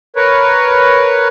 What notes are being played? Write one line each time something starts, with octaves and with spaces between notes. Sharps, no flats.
A#4 B4 C#5